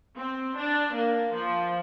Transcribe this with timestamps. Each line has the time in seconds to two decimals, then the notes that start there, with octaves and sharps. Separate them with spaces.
0.19 C4
0.57 D4
0.96 A#3
1.34 F3